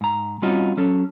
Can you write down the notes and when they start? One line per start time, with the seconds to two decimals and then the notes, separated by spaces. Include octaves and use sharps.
0.01 G#2 A#5
0.42 G3 C4 C#4 D#4 F4 F#4
0.77 F#3 C#4 A4